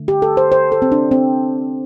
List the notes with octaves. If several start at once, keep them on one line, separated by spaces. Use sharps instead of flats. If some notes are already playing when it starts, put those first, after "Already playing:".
Already playing: D3 A3
G4
A4
C5
C5
A4
C4
D4
C4